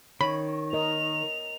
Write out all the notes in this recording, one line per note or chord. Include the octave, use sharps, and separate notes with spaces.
D#3 C#5 B5
A#4 D#5 F7